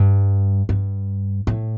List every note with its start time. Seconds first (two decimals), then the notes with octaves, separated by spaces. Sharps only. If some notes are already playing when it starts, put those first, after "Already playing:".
Already playing: G2
0.69 G2
1.47 A2